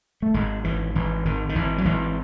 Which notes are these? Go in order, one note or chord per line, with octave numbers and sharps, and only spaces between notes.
A3
G#1 G#3
G#1 E3
G#1 E3
G#1 D#3
D#3
G#1 E3
F#3
G#1 E3